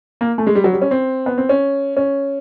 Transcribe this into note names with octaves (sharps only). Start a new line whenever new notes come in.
A#3
A3
G#3
G3
F#3
G3
C#4
C4
B3
C4
C#4
C#4